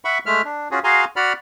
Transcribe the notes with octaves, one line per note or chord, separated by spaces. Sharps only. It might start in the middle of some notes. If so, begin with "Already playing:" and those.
E5 F#5 B5 C#6
G#3 A3 E5 F6
D4
C#4 F4 F#4 G#4
F#4 G#4 F5 G#5 A#5 C6
F#4 D5 F#5 B5 F6